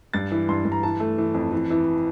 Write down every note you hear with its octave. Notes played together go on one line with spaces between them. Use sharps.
G2 A6
E3
G2 C6
G2
A#5
E3 A5
A3
E3
F2
E3
E3